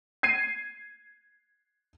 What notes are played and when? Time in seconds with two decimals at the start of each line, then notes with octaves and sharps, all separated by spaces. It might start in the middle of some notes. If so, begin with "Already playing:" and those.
0.23 G#6 C7 D#7